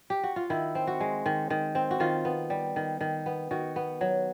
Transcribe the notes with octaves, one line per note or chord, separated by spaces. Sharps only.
G4
F#4
F4
D#3 E4
C4
F#4
G#3
D#3
D#3
C4
F#4
D#3 F4
B3
G3
D#3
D#3
B3
D#3 F#4
B3
F#3